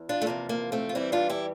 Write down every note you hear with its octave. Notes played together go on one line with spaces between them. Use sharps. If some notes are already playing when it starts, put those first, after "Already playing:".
Already playing: E2
D4 F4
A3
E2 C3 F3 A#3
A#3
A3 C4
F4
E2 E3 G3 C4 E4
D4 F4
E4 G4